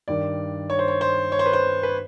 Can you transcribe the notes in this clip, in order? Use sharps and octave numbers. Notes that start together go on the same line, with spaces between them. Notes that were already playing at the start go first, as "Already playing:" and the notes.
G2 D#3 D5
C#5
C5
C#5
C5
C#5
C5
B4
C5
B4